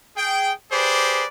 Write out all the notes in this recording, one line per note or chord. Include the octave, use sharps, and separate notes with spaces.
G#4 G5
G4 G#4 B4 C5 D5